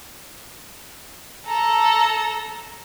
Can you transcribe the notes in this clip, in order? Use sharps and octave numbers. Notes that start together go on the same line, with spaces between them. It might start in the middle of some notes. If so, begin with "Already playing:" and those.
A4 A#5